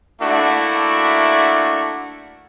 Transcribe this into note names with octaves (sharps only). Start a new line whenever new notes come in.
A3 A#3 D4 E4 F#4